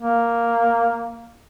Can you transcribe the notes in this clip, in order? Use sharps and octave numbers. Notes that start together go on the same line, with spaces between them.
A#3